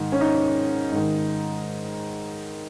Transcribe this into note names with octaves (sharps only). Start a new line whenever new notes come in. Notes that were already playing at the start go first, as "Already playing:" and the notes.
Already playing: G#2 D#3
C#4
D#4
G#2 D#3